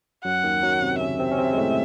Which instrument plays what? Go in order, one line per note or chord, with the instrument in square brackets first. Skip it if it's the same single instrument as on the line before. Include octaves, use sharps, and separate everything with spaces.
[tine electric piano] F#2 F#3 [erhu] F#5
[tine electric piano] D#2 D#3
F#2 F#3
C3 C4
[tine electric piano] C#3 C#4 [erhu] E5
[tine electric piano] C3 C4
C#4
C3 C4
G#3
A2 A3